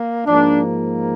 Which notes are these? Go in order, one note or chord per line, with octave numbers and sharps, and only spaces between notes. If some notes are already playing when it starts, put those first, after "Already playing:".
Already playing: A#3
G#2 F3 A#3 D4